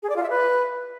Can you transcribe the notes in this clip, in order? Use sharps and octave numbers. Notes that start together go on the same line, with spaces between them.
G#4
D5
F4
E5
B4